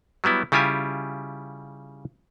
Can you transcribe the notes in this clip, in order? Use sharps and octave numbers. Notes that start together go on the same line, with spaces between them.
F#3 G3 B3 E4
C#3 G3 E4 F4 G4 G#5